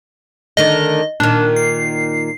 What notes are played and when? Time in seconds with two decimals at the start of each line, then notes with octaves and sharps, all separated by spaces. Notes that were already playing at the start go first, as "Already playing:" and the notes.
0.57 D3 D#3 A3 D#5
1.20 A#2 D#3 D4
1.56 C7